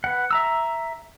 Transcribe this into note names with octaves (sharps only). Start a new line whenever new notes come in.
B4 F#5
E5 A#5 E6